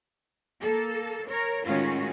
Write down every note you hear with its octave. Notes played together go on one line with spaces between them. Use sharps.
A#3 A4
A#4 C#5
A2 D#3 G#3 C#4 F4 F#4